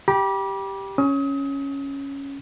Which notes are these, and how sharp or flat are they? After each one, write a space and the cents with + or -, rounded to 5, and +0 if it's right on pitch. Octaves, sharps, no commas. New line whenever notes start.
G4 +0 B5 -35 D6 +0
C#4 +0 D#6 +35